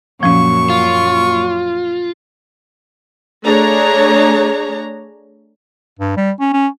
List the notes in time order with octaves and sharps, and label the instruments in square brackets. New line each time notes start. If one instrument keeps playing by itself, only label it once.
[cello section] F#2 A#2 F#3 [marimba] F3 C#4 [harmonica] C#6
[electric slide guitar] F4
[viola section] A3 D4 G#4 C#5 A#5
[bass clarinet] G2
G3
C#4
C#4